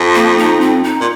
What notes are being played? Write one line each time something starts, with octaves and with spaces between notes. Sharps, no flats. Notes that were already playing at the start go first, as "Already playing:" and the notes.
Already playing: F2
A#3
D#4
C4
D#4
A#2